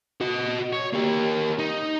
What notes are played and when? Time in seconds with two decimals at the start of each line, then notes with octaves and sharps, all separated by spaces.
0.21 F#4 D#5
0.73 C#5
0.94 A#3 G4
1.59 D#4